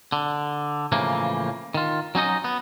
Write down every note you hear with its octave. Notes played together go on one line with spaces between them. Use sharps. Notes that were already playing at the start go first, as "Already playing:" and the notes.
D3
A2 C#3 E3 F3 A#3
D#3 F4
F#3 C#4 D#4 D#5
B3